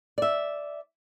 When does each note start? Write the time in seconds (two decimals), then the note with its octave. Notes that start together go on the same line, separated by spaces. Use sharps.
0.18 D5 E5